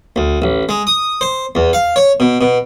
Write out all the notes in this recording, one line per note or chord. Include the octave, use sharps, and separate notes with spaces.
D2
A1
G#3
D#6
C5
E2
F5
C#5
B2
B2